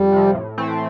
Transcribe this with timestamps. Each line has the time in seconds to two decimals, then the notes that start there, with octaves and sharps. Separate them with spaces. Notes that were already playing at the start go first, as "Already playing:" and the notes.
Already playing: F2 G3
0.13 C3 F3
0.35 A2
0.58 E3 A3 C4